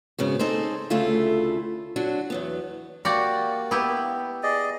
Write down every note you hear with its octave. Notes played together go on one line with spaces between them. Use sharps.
G#2 C#3 B3 F#4
C4 D#4 G#4 A4 C5
D2 C#3 A3 E4 F4 A4
F#3 D4 F#4
E2 F#3 B3
A#3 F#4 G4 D5
B3 E4 G4
G#4 D5 D#5